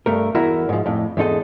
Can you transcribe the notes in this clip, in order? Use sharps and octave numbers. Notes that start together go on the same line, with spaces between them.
G2 A3 A#4
E2 E4 F#4 A#4 E5 A#5
G#2 F3
F2 A2
E2 G#2 D#4 A4 D#5